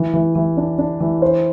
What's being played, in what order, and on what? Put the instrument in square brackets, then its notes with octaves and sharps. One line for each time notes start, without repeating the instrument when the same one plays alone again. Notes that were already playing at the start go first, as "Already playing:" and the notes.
Already playing: [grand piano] E3
E3
E3
D4
D4
E3
C5